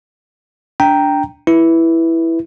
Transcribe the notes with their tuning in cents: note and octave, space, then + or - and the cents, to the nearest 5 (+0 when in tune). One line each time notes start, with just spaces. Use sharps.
D4 -10 G5 +0 A#5 +0
E4 +0 B4 -10